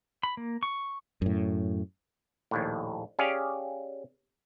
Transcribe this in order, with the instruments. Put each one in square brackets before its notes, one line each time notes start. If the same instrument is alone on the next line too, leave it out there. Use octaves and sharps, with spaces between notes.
[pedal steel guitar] B5
A#3
C#6
[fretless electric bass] F#2 A2
[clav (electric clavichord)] A#1 D#2 A2
C#4 G4 G#4 D5 F5